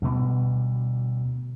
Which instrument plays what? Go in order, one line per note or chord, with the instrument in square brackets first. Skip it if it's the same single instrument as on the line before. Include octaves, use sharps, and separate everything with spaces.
[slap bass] D2 B2 G3